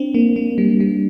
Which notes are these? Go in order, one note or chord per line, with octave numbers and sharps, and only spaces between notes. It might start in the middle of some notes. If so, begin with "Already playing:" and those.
Already playing: C4 D4
A#3
A#3
G3
G3